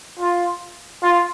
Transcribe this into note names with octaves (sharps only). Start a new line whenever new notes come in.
F4
F4